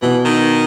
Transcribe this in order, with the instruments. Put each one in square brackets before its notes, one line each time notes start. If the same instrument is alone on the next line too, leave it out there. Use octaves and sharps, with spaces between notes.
[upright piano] B2 [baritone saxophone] E3
[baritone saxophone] D#3